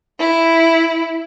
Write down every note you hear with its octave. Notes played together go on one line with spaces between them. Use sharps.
E4